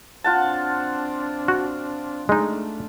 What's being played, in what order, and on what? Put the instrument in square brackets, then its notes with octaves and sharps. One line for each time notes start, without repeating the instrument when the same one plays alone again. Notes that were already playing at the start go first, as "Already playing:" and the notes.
[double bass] C4 D4 [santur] F4 F#5 A5
[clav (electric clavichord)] F#4
[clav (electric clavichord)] G#3 D#4 [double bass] A3 D4